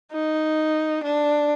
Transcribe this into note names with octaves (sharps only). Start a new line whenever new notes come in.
D#4
D4